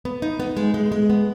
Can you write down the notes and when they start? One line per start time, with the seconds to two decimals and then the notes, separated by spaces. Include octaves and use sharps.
0.05 B3
0.22 D#4
0.40 B3
0.57 G#3
0.74 G#3
0.92 G#3
1.10 B3